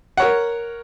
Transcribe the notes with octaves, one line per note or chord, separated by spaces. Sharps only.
A#4 C#5 F#5